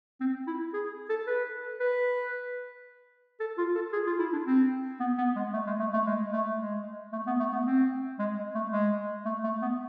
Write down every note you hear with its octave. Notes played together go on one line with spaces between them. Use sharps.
C4
E4
G#4
A4
B4
B4
A4
F4
A4
G#4
F4
E4
D4
C4
B3
B3
G#3
A3
G#3
A3
A3
G#3
A3
G#3
A3
B3
A3
B3
C4
G#3
A3
G#3
A3
A3
B3